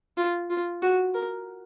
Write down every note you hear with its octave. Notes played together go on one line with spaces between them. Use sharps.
F4
F4
F#4
A#4